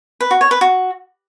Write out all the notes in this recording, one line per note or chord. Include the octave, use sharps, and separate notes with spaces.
B4
F#4
C#5
B4
F#4